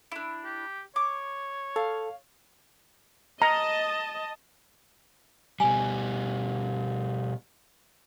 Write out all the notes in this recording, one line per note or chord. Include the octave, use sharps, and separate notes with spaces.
D4 E4
G4
C#5 D6
A4 F5
D#5 A5 A#5
B2 G3 G#5